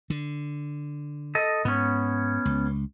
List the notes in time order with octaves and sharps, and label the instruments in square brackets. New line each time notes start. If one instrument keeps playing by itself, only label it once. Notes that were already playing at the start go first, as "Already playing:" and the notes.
[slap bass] D3
[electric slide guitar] A4 D#5
[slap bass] G#2 [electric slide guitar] B3 C#4
[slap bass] C#2